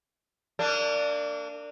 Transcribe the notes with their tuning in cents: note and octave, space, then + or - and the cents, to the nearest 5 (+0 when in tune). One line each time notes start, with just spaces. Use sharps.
A#3 -35 D4 +0